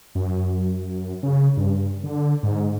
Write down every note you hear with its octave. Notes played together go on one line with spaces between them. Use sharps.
F#2
C#3
G2
D3
G#2